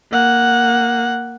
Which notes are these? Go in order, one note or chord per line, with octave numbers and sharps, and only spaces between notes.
A#3 F#5